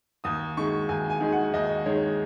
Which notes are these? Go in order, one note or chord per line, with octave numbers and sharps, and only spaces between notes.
D#2 D#6
D#3 G#3 C#6
D#2 G#5
G#5
D#3 G#3
F#5
D#2 D#5
D#3 G#3 C#5